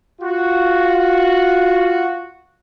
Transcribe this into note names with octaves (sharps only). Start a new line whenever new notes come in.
F4 F#4